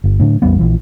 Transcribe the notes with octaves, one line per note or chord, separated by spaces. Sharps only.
G1
A2 D3
A1 E2 G3 B3
A#1 E3